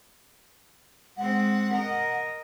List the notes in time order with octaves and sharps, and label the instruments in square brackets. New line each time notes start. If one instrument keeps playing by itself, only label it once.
[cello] G#3 C4 [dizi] F#5
[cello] A#4 D#5